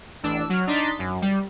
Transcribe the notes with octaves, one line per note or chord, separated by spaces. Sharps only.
A1 D4 E6
F#3 F6
D4 D#4 C6 A6 B6
F#2
G3